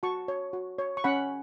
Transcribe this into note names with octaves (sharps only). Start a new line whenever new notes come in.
F#4 A5 C#6
C#5
F#4
C#5
C#6
C#4 F#5 B5